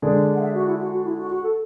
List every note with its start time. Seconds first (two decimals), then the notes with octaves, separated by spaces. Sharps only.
0.02 D3 G#3 D4 G#4
0.35 F#5
0.40 E5
0.54 F#4
0.66 E4
0.79 F#4
0.92 F#4
1.04 E4
1.18 F#4
1.31 F#4
1.43 A4